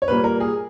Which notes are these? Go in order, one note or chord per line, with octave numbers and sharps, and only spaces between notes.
C#5
A#2 G3 A#3 B4
A#4
G#4